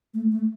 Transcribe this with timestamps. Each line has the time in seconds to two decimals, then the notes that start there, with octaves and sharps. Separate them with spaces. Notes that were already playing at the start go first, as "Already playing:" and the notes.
0.14 A3
0.31 A3